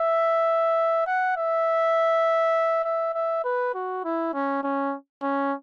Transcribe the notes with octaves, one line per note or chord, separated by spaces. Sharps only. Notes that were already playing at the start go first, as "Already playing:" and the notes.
Already playing: E5
F#5
E5
E5
E5
B4
F#4
E4
C#4
C#4
C#4